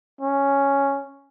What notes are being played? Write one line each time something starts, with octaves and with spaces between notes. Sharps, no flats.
C#4